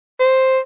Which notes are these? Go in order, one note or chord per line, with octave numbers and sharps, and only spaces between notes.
C5